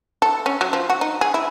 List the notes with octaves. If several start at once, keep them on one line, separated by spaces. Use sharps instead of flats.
A4
C#4
F#3
F3
F#4
D#4
G#4
E4